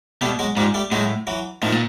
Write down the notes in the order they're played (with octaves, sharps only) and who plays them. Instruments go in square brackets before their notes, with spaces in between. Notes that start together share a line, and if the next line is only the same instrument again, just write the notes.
[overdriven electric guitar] B2 [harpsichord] G3 A3
[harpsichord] F#3 G#3
[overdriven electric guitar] G#2 [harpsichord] F3 G3
[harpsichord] G3 A3
[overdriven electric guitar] A2 [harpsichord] F#3 G#3
[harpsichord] E3 F#3
[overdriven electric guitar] A2 [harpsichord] D#3 F3
[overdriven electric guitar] A#2